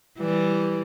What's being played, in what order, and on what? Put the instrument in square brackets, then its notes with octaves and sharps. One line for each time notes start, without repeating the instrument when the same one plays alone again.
[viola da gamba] E3 G3